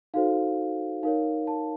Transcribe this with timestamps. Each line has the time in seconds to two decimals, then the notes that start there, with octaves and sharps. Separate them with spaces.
0.14 D#4 F#4 A4 C5 F5
1.03 D#4 A#4 C#5 F5
1.47 A5